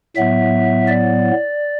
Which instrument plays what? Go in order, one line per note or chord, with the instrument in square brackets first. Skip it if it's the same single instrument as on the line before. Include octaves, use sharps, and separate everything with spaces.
[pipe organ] A2 F#3 B3 E5
D5